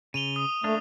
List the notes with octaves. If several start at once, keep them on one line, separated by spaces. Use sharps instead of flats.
C#3 D#7 F7 G7
D#6
A3 A#3 D4